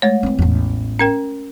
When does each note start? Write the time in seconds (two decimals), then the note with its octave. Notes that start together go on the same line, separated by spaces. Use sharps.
0.02 G#3 A3 C#5
0.23 E3 C4
0.39 A1 E2
0.99 C#4 A#4 G5